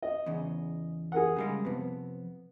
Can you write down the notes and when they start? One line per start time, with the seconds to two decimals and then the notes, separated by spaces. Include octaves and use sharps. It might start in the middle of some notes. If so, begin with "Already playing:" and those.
0.02 D#5
0.26 E2 C#3
1.12 G#4 A#4 F#5
1.37 C#3 G3 G#3
1.65 F2 C3 B3